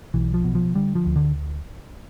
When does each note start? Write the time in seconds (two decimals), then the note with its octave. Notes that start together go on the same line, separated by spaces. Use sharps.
0.14 B1 E3
0.34 F3
0.44 B2
0.55 F3
0.75 D3 G3
0.95 F3
1.06 D2
1.16 D3